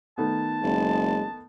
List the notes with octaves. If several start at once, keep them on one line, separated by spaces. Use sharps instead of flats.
D#3 A3 B3 A5
F#1 G#3